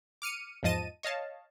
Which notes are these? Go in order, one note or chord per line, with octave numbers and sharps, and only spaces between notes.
D6 F6 C#7 D#7
E2 G#2 F3 D#5 A5 D#7
C#5 D#5 F5 A5